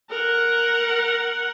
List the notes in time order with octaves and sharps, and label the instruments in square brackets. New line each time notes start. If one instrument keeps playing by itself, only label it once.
[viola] A#4 F#5